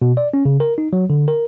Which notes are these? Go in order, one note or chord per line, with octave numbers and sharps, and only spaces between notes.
B2
D5
C#4
C#3
A#4
D#4
F#3
D3
A#4